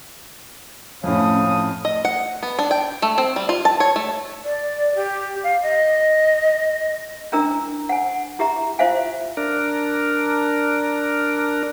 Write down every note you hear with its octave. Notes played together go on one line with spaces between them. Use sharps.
F2 A2 A3 C#4 F5 D#6
D#5
F#5
B3
D4
G5
A3
C4
G3
F4
A5
C#5
A3
D5
G4
F5
D#5
C#4 D4 E4 A#4 A#5 E6
F#5 G#5
E4 G4 E5 A#5
E4 F4 C5 E5 F5 G#5
D4 A#4